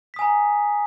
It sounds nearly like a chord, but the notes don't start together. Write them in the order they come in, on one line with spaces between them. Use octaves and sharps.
B6 D#6 G#5 A#5